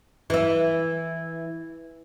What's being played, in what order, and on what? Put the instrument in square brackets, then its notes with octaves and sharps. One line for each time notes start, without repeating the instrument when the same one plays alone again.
[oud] E3 E4